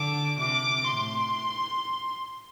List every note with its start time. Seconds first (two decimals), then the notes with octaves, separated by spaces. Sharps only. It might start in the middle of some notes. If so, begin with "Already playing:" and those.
Already playing: D3 D6
0.40 C3 D6
0.87 A2 C6